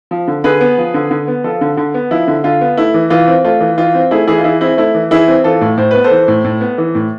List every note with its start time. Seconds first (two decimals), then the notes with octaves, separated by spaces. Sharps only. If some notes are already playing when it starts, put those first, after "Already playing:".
0.11 F3
0.28 D3
0.44 D3 G#4 B4
0.60 B3
0.78 F3
0.94 D3
1.11 D3
1.28 B3
1.44 F3 F4 A4
1.61 D3
1.77 D3
1.94 B3
2.11 F3 E4
2.27 D3
2.44 D3 F4
2.61 B3
2.77 A3 E4
2.94 E3
3.10 E3 F4
3.27 C4
3.44 A3 F4
3.61 E3
3.78 E3 F4
3.94 C4
4.11 A3 E4 G#4
4.27 E3 E4 G#4
4.38 F4
4.44 E3 E4 G#4
4.61 C4 E4 G#4
4.77 A3 E4
4.95 E3
5.11 E3 E4 G#4
5.28 C4
5.44 E3 F4 A4
5.61 A2
5.78 A2 C5
5.91 B3 B4
6.04 A4 C5
6.11 E3
6.28 A2
6.44 A2
6.61 B3
6.78 E3
6.95 A2